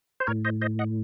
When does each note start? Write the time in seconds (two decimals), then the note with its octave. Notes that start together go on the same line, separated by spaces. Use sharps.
0.20 C5
0.27 A2 A#4 C#5
0.45 C5 D#5
0.62 C5 D#5
0.79 D#5 F#5